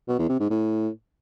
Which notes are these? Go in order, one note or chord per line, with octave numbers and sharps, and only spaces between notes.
B2
E2
C3
G#2
A2